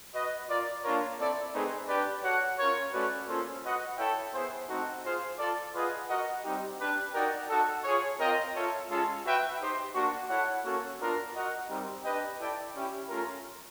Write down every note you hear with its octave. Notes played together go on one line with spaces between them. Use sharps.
F#4 B4 D#5
F4 A#4 D5
A#3 D4 F4 A#4 C#5
C4 E4 A4 D5
A3 C4 D#4 G#4 B4
D4 G4 B4 D5
F#4 A4 C#5 F#5
C#4 F4 A#4 C#5
A3 C#4 F#4 B4 D5
A#3 C#4 F4 A4 C5
F#4 B4 D#5 F#5
E4 A4 C#5 E5 G5
B3 E4 G#4 C5
A3 C4 D#4 F#4 A4
F4 G#4 C5 F5
F4 A4 D5
F4 G#4 B4 D#5 F#5
F#4 A#4 D#5 F#5
G3 C4 D#4 G4
D4 G4 B4
D#4 F#4 A#4 D5 G5
D#4 F#4 A4
F4 G#4 C#5
C4 F4 A#4 D#5 G5
F4 A4 C#5 E5
G#3 C#4 F4 A4
F#4 B4 E5 G5
D#4 G4 C5
A#3 D4 F#4
E4 A4 C#5 F#5
A#3 C#4 F#4 A4 C#5
B3 D4 F4 A#4
F#4 A#4 D#5 F#5
G3 C4 D#4 G4 A#4
D4 G4 B4 D#5 G5
E4 A4 D5 G5
C#4 E4 G4
A3 C#4 F4 A#4